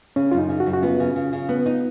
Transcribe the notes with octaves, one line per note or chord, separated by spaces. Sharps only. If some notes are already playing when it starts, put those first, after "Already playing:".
C#3 C#4
F#2 F4
D#4
C#3
F#4
F#2
F#4
B3 F4
C#3
C#3
C#3
B3
D#4